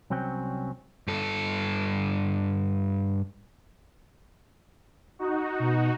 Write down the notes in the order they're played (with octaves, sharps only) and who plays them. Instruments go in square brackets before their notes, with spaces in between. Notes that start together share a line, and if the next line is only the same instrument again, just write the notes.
[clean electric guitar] C2 F#3 C4 C#4 G5
[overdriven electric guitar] G2 A4
[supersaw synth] D#4 F#4
[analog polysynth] B2